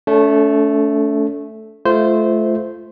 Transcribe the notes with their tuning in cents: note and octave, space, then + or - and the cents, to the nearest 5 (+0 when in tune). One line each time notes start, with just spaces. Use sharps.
A3 +0 C#4 +45
A3 -20 F4 -15 C5 -15